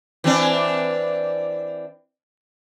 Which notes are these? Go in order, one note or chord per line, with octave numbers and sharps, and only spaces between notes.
E3 C4 D4